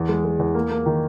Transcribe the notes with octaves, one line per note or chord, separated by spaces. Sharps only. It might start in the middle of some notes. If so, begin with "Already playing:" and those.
Already playing: E2
G#3
G#3
E2
A#3
A#3
D#3